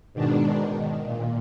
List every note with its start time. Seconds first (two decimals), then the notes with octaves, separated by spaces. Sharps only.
0.13 G#2 B2 D#3 D4
0.61 D#3
1.04 A#2